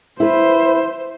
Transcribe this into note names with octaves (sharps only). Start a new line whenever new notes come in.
E4 B4 C5